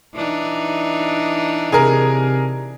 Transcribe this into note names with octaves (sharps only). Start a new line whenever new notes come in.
E3 D4 D#4
C3 G#4 A#4